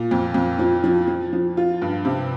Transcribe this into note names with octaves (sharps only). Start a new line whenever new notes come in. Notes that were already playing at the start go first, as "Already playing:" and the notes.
Already playing: A#2
F2
F2
F3
F3
F3
F3
F4
G2
C3